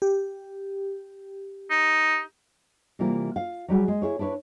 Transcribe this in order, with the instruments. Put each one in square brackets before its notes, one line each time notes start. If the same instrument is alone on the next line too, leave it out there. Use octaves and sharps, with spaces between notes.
[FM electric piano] G4
[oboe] D#4
[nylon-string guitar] C3 E3 G3 A#3 F4
F4 F5
F#3 G3 F#4 G#4
G#3
E4 G#4 C#5
D4 E4 B4 C#5